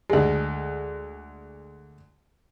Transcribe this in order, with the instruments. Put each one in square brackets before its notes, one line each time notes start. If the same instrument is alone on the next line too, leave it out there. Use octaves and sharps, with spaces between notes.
[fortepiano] D2 G#3